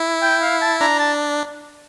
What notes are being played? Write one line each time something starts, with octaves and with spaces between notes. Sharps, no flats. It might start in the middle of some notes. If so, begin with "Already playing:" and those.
Already playing: E4
G5
F5
A5
D4 A#5
A5